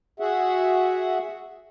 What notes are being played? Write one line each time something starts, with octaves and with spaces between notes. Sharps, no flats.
F#4 G#4 E5 F#5